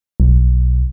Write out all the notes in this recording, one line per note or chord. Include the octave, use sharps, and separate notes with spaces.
B1